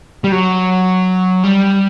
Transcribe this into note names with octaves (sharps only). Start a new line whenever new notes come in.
G3
F#3
G3